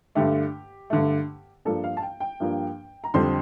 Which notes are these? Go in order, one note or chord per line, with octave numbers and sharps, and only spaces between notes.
G2 D3 A3 G4
G2 D3 A3
G2 F3 A#3 D4 A4
F5
A5
G5
G5
G2 F3 A#3 D4
A#5
F2 D3 G3 C4 C6